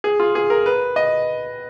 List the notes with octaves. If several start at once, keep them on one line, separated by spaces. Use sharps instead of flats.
G#4
F4
G#4
A#4
B4
D#5